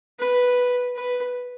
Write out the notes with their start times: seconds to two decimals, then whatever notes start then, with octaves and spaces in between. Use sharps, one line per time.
0.20 B4
0.96 B4